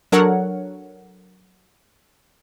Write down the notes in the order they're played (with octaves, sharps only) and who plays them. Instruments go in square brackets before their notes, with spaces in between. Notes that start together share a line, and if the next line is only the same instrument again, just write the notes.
[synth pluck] F#3 D4 A4 A#4 C#5 F#5